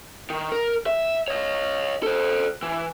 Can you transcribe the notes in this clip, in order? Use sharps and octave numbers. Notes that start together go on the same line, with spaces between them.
D#3
A#4
E5
C#5 D#5
A4 C5
E3